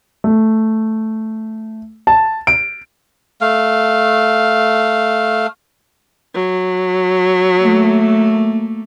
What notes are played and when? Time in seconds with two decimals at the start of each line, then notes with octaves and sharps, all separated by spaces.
0.24 A3
2.07 A5
2.47 D7
3.41 A3 F5
6.34 F#3
7.59 A3 A#3